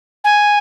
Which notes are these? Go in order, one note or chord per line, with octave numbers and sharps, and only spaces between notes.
G#5